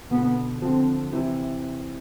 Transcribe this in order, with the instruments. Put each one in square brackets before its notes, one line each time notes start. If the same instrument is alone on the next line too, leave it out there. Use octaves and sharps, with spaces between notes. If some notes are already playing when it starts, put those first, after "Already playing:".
[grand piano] B2 D3 [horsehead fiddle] B3
[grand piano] D3 F3 [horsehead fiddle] C4
[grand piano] C3 E3